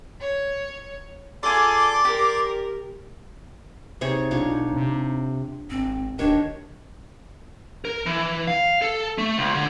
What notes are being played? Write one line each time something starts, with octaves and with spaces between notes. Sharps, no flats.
C#5
F4 G#4 A4 D5 G#5 C6 D6
G4 A#4
C3 D#4 G#4 C#5
B1 D4 F4 C#5
C3
G#1 C4
D1 D#3 D4 G4 C#5
A#4
E3
F5
A4
A3
C#2
D3